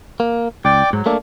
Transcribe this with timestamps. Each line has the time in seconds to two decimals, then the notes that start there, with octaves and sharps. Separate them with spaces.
0.20 A#3
0.65 C#2 D5 G5 D6
0.93 G#2 F#3
1.06 A3 A#3 D4